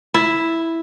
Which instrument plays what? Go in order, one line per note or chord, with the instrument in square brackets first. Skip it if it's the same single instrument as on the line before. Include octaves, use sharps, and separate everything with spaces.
[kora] E4